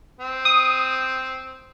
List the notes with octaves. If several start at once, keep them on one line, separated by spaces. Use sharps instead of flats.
C4
D#6